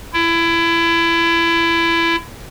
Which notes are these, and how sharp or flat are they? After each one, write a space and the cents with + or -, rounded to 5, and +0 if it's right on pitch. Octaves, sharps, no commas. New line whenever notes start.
E4 +25